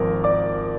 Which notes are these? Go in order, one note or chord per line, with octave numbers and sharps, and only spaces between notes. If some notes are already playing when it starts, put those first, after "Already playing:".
Already playing: G#1 F3 A#4
D5 D6